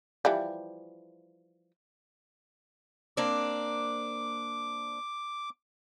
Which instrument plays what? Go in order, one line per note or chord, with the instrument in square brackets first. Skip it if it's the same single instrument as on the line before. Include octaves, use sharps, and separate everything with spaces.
[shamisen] E3 F3 G3
[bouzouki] A#3 C4 D4 [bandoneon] D6